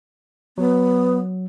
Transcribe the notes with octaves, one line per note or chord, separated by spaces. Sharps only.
F#3 B3